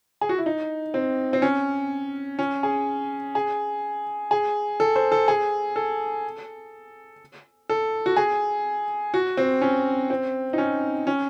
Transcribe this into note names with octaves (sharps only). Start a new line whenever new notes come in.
G#4
F#4
E4
D#4
C4
C4
C#4
C#4
G#4
G#4
G#4
A4
C5
A4
G#4
A4
A4
F#4
G#4
F#4
C4
C#4
C4
D#4
C#4
C#4